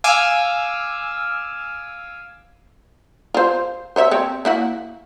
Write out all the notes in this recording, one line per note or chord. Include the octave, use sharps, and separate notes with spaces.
F5 G#5 D6 E6 F6
F4 C5
C5 C#5 E5
C4 C#5
A#3 E4 F#4